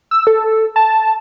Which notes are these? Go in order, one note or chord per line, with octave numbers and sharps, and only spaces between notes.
E6
A4
A5